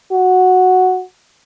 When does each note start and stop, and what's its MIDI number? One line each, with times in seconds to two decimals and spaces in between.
0.12 1.02 66